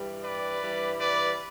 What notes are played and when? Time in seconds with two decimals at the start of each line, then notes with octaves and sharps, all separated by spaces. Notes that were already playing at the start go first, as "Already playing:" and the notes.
Already playing: G2 E3 G3
0.23 B4 D5
0.61 G2 E3 G3
0.98 B4 D5